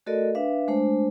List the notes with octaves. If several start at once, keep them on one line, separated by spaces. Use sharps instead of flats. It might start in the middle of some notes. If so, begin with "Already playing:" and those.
A3 F#4 A4 A#4 D5 D#5
D4 B4 E5 F5
G#3 A3 D4 C5